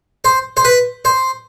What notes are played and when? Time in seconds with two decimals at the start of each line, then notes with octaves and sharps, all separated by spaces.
0.25 C5
0.57 C5
0.65 B4
1.05 C5